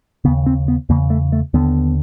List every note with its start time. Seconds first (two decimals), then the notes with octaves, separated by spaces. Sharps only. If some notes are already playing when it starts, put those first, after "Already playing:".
0.25 D#2 C#3 B3
0.46 C4
0.68 B3
0.89 E2 C#3 A#3
1.10 A3
1.32 A3
1.54 D#2 D3 B3